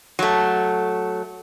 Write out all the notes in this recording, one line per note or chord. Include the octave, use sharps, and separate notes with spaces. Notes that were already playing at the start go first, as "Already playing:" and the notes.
F#3 A3